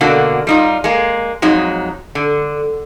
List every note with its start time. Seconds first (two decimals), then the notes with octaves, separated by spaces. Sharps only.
0.01 B2 D3 A#3 D4 F#4
0.47 G3 D#4 F4
0.84 G#3 A#3
1.42 F2 F#3 G#3 D#4
2.15 D3